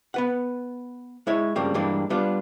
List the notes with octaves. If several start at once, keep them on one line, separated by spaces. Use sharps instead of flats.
B3 B4 F#5
G#3 E4 C#5
G2 C#3 F3 G3 A#3 C4
G2 E3 G3 G#3 A#3 D4
G3 B3 D4 F4